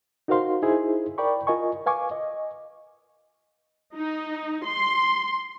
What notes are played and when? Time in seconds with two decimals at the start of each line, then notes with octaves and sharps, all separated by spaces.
0.28 D#4 F#4 A#4 C5 F5 C6
0.62 D#4 E4 G#4 C5
1.18 A#4 D5 G5 B5 C#6
1.47 F4 A#4 D#5 G#5 C#6
1.86 B4 F5 G#5 C#6 D6
2.11 D#5
3.95 D#4
4.65 C6